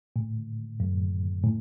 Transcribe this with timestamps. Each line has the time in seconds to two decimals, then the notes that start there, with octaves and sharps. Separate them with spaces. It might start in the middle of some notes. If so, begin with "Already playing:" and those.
0.16 A2
0.80 F#2
1.43 A2